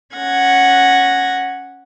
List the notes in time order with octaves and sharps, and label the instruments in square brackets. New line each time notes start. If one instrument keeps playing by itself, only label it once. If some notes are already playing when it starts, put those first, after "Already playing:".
[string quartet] C#4 F#5 G#6 A#6